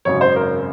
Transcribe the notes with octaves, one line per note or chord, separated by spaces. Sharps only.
G#1 F#2 C#3 C#5
C5
A#4